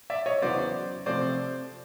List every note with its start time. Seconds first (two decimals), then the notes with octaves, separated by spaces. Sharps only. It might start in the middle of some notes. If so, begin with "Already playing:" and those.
0.10 D5 E5
0.26 C#5 D#5
0.42 E2 C#3 F#3 B3 C5 D5
1.06 C3 F3 A3 C4 C5 D5